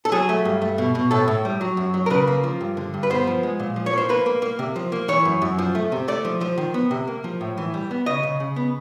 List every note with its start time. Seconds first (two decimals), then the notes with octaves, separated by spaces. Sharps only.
0.05 A4
0.12 F#3 G#4
0.29 A3
0.45 G2
0.62 A3
0.78 B2
0.95 B2
1.11 A2 A4
1.28 A2
1.45 G3
1.61 F#3
1.77 F#2
1.94 F#3
2.06 A#4
2.10 C#3 B4
2.27 A#3
2.44 F3
2.61 G2
2.77 D3
2.94 G2
3.03 B4
3.10 B3 C5
3.27 F3
3.43 G#3
3.59 A#2
3.76 F3
3.86 C#5
3.93 A#3 C5
4.09 A#3 B4
4.26 A#3
4.42 A#3
4.59 C3
4.76 F3
4.92 A#3
5.08 E3 C#5
5.25 F#2
5.42 F#2
5.59 F3
5.75 A3
5.92 C3
6.08 A3 D5
6.25 F3
6.41 F3
6.58 D#3
6.74 B3
6.91 C3
7.07 A#3
7.24 F3
7.41 A2
7.58 E3
7.74 G3
7.91 B3
8.06 C#3 D#5
8.23 C#3
8.40 C#3
8.56 B3